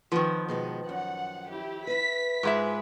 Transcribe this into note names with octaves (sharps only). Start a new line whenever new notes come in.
F2 D#3 F3 B4 F#5
B2 G#3 B3
F#2 F#5
E4 G4
B4 E5 B6
G#2 G#3 F4 B4 E5